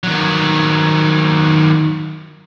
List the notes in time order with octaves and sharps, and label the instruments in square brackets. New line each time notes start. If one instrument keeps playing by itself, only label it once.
[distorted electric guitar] D#3 F#3